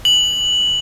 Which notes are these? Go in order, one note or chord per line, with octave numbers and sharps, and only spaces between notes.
F#7